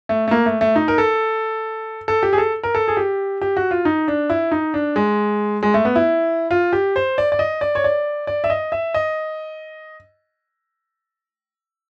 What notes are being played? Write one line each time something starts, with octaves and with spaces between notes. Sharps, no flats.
A3
A3
A#3
A3
A3
D#4
A#4
A4
A4
G4
G#4
A4
A#4
A4
G#4
G4
G4
F#4
F4
D#4
D4
E4
D#4
D4
G#3
G#3
A3
B3
E4
F4
G4
C5
D5
D5
D#5
D5
C#5
D5
D5
E5
D#5
E5
D#5